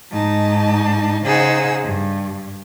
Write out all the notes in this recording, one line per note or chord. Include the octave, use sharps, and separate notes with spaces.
G#2 D#4 A5
C#3 D#4 G#4 C5 F#5 E6
G2